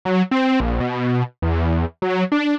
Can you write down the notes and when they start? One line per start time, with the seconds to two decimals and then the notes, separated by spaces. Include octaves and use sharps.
0.05 F#3
0.31 C4
0.60 A#1
0.80 B2
1.42 E2
2.02 F#3
2.32 D4